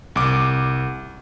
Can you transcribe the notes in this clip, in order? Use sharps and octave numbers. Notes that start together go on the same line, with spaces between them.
C2 D6